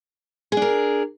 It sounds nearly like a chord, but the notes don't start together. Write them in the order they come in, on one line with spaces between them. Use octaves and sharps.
G#4 D4 A#4